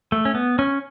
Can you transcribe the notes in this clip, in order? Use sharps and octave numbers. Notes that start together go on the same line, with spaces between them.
A3
C#4
B3
C#4